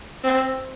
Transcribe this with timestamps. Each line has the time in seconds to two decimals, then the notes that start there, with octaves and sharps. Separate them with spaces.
0.24 C4